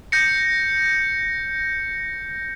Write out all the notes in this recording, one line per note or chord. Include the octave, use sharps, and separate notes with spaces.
G6 A#6 C#7